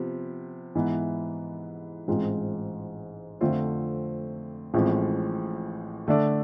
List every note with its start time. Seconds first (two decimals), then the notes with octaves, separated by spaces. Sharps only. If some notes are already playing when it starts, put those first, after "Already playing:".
Already playing: C3 F3 B3
0.75 G#2 E3 B3
2.08 A1 G#2 G#3 C4 F4
3.41 F2 D3 A3 C4 F4
4.74 A1 A2 F3 G#3 C4
6.08 D3 A3 D4 A4 D5